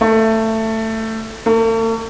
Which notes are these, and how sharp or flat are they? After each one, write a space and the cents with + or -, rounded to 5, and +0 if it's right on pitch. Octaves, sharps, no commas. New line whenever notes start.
A3 +15
A3 +45